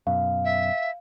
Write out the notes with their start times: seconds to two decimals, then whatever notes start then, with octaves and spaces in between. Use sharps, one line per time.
0.07 F#2 B2 F5
0.44 E5